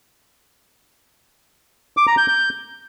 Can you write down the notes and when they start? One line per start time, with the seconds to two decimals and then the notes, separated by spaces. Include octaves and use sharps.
1.97 D6
2.07 A#5
2.18 G6
2.28 G6